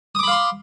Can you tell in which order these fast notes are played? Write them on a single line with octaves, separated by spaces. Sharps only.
D#6 D6 B5 F5 C6